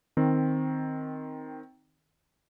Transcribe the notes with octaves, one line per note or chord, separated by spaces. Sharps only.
D#3 C4